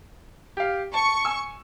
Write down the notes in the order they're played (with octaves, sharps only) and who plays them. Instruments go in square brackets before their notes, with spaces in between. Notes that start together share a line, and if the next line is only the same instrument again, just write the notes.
[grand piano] G4 F5
[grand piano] A5 [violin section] C#6
[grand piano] G#5 E6